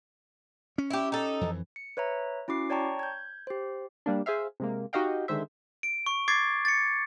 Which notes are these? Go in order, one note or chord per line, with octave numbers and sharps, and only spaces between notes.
C#4
E4 G4
D#4 A4
F2 E3
C#7
B4 C#5 E5 A#5
C#4 E4 F#4 D6 C7
C#5 D5 G5 A5 A#5 C#6
G6 G#6
G4 C5
G3 A#3 D4
G#4 C5 E5 F5
C3 G#3 A#3
D#4 F#4 G4 D#5 F5 G5
D3 D#3 G#3 C5 E5
D7
C#6
D6 G#6 A6 C7
A6 C#7